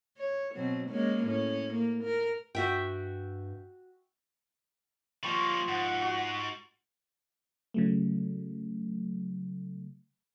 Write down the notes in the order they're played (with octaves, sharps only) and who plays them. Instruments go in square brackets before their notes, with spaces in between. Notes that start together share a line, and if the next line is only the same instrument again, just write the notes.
[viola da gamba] C#5
B2 F#3 C4
G#3 A#3 C#4
A2 C#4
A#3
A#4
[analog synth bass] G2 [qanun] F#4 E5 G5
[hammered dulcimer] F3 B5 C#6 [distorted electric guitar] G3 A#3
[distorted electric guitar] G#2 [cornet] F#5
[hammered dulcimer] F#4
[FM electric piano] C#3 F#3 A3